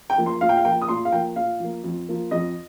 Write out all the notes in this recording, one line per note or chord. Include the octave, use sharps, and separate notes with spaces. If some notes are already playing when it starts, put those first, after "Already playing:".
G5
F3 A#3
C6
A#2 F5
G5
F5
F3 A#3 G5
D#6
A#2 C6
F5
F3 A#3 G5
A#2 F5
F3 A#3
F2
F3 A#3
F2 D#5